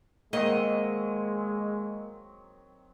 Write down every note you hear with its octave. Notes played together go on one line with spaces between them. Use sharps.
D#3 F#3 G#3 A#3 C4 D#5